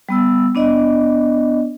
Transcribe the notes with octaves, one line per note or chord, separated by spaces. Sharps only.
G3 B3 E6
B3 D4 D5 D#5